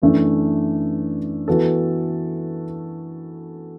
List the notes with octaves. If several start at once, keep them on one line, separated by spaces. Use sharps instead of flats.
F#2 E3 A3 D4
E3 B3 F#4 A4